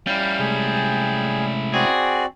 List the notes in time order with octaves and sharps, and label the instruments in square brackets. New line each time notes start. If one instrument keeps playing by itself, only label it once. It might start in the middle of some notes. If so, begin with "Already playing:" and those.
[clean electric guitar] G3 [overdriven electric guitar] C#4 E4 [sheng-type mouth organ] F5
[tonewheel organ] C3 G#3 A3 [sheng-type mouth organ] G#4
[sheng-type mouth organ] C4 F#4 D5 [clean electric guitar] G#4